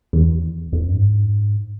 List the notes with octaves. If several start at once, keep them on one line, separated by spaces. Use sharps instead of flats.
E2
F2
F#2
G#2